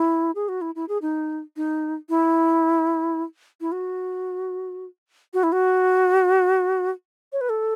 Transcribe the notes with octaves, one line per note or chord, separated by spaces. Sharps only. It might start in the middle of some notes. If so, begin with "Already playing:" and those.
Already playing: E4
G#4
F#4
E4
E4
G#4
D#4
D#4
E4
E4
F#4
F#4
E4
F#4
C#5
B4
A4